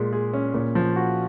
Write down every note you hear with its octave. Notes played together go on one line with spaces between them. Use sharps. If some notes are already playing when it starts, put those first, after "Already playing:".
Already playing: A#2 G#3
G#4
C#4
A#2
F3
F#4